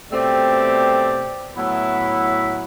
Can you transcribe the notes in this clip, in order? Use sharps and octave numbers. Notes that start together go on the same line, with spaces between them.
B2 A3 C4 G4 D5
A2 F#3 B3 E4